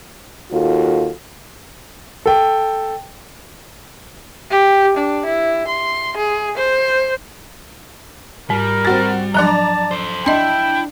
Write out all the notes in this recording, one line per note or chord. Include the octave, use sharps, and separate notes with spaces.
D#2 F4 F#4 A4
A4 G5
G4
D4
E4
C6
G#4
C5
G#2 G3 A#4
C4 F#4 A6
F3 F#3 D4 D5 A5 A#5
A4 C5
D4 E4 D#5 G5 C6